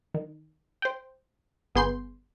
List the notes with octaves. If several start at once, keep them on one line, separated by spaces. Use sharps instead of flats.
D#3
C5 G5
G1 B3 G#4 C6 G6 C7